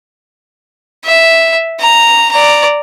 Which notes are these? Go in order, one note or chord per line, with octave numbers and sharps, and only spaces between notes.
E5
A#5
D5 A#5